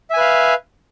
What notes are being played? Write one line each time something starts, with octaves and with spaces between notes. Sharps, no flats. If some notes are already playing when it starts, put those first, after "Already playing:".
B4 E5 F5 G#5